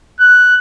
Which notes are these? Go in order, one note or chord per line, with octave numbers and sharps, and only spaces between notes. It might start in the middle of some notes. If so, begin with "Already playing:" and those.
F#6